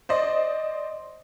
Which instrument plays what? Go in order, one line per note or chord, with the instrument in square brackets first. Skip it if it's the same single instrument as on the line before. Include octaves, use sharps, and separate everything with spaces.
[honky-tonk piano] C5 D5 D#5